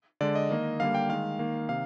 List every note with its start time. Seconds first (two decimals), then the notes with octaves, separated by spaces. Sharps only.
0.21 D3 G#3 D5
0.35 D#5
0.50 D#3 A#3
0.80 D3 G3 A#3 F5
0.95 G5
1.09 D#3 G#3 F5
1.39 D#3 A#3
1.69 C3 D#3 F5